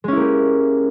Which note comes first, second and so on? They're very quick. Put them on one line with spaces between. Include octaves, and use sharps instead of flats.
G#3 C#4 E4 A#3 G4